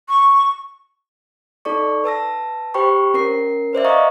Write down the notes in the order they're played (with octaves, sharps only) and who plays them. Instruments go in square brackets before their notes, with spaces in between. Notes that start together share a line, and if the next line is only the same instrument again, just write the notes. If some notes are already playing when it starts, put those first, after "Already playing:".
[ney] C#6
[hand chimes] D#4 A4 D5 C#6
B4 A5 E6 A#6
G4 C5 G5 B5 C#6
C#4 A#4 C7
B4 C5 D5 E5
D#5 F5 A#5 C#6 D#6